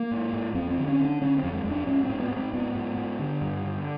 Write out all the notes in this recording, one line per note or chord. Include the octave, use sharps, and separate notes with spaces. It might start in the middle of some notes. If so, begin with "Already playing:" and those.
Already playing: A#3
G#2
G#2
F2 C4
C4
D3
C#4
D3
D4
D3 C#4
C4
F2
G#3
F2
D4
G#2 C#4
C4
G#2
B3
G#2
C4
G#2 B3
G#2
G#2
D3
G2
D3